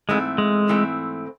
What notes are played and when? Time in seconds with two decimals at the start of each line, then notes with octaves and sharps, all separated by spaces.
0.09 G#2 E3 G#3 A3 C4
0.38 G#3
0.68 G#2 E3 A3 C4